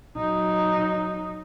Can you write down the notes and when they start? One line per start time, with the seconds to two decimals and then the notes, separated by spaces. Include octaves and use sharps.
0.17 F#3 D#4